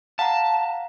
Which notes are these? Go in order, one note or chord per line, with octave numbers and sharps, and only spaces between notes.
F5 F#5 A5 A#5